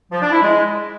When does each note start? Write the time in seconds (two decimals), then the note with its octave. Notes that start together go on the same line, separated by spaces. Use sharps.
0.12 F3
0.22 D4
0.32 E4
0.42 G#3